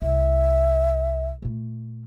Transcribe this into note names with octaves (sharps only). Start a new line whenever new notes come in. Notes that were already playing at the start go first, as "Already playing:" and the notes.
C2 E5
A#2 A3